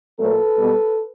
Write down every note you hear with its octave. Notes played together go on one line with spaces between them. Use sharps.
A#2 F#3 A3 A4 B4
B2 G3